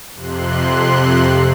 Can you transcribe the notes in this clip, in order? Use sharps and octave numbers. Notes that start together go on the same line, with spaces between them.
F2 C3 C6 F#6